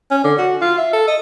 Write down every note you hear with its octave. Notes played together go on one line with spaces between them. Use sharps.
C#4
D3
F#4
F4
E5
A4
D#5